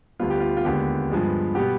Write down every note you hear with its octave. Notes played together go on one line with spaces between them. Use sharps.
D2 D3 G3 B3 F4
G4
F4
F4
D#2 D3 G#3 B3 G4
G2 F3 G#3 B3
B2 G3 B3 G4